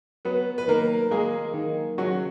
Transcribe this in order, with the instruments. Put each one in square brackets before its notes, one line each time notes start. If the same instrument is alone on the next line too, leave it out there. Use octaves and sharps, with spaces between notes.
[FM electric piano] F#3 [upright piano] B3 B4
[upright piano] B4
[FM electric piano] D#3 [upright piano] A#3 A#4
[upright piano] G#3 G#4 [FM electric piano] A#3
[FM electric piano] D#3
[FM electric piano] C#3 [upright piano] F#3 F#4